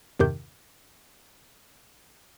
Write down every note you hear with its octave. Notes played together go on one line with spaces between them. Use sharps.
E2 G2 C3 D#3 D6 G6